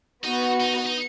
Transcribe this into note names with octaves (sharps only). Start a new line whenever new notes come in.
B3 D#4 F#4 B4
D#4
D#4